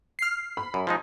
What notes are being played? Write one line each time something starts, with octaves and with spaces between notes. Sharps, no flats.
F6 C7
B5
F#2
F3 G#3 D#4